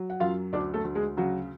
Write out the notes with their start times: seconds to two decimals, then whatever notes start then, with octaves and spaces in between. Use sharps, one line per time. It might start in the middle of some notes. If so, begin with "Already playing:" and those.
Already playing: F#3
0.10 F#5
0.20 F#2 F4 F5
0.53 D2 D4 D5
0.74 A3 A4
0.84 D2
0.95 G#3 G#4
1.17 C#3 F#3 F#4